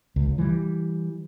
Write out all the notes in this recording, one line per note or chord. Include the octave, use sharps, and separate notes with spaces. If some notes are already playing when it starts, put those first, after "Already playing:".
C#2
E3 G3